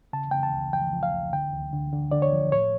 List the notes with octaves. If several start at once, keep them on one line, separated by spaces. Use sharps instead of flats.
C#3 A5
C#3 G5
A5
C#2
F3 G5
F3
F5
C#2
D3 G5
D2
D3
D3
D3 D5
C#5
F3
A2 C#5